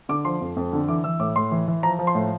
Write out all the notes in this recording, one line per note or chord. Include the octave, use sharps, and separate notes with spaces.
D3 D6
F3 C6
F2
F2
D3
E3 D6
E3 E6
A2 D6
A2 C6
E3
E3
F3 A#5
F3
C6
A2